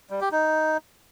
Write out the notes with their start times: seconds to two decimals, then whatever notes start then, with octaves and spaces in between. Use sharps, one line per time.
0.10 G3
0.21 G4
0.32 D#4